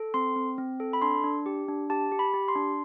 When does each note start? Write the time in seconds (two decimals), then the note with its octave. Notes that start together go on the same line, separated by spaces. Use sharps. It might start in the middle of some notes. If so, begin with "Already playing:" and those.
Already playing: A4
0.14 C4 C6
0.36 C4
0.58 C4
0.80 A4
0.93 B5
1.02 D4 C6
1.24 D4
1.46 G4
1.68 D4
1.90 G4 A5
2.12 G4
2.19 B5
2.34 G4
2.48 C6
2.55 D4